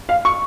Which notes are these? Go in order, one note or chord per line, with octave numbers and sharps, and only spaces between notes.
F5
C#6